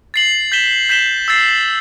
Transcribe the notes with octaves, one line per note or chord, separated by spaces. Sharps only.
A6 C7 F#7
G6 B6 E7 G7
G6 B6 E7 G7
E6 A6 C7